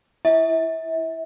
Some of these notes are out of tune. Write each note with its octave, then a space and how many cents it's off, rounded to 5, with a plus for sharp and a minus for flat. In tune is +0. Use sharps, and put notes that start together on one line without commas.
E4 +10 E5 -30